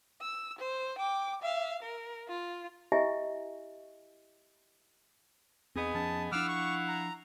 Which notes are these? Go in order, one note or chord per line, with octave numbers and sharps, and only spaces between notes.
E6
C5
G5 D6
E5 F5
A#4
F4
E4 G4 D#5 E5 G#5
E2 B3 C4 D#4 G#4
F2 F3 C#4 A5
F3 D4 E4 F5 F#5 D6 E6 F6
C#6
A#5